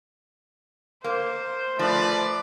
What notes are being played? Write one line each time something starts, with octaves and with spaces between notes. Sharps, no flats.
A#3 C5
F3 A3 A#4 B4 D5